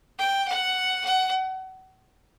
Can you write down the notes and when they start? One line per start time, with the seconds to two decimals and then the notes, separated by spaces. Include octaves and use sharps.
0.18 G5
0.48 F#5
1.05 F#5